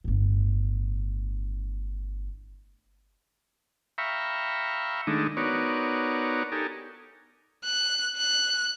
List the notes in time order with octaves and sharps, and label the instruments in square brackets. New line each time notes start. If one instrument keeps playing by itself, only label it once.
[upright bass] G1 A2
[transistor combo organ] E5 F5 G5 A#5 B5 C#6
D#3 G#3 A3 D4 D#4
B3 D#4 F#4 A#4 C#5 D5
D#4 G4 A4 A#4 G#5
[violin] F#6
F#6